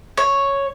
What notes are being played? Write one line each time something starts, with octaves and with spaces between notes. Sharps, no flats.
C#5